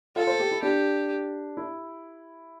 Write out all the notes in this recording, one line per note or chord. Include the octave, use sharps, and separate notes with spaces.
F4 A4
C5
G4
E4
D4 G4
E4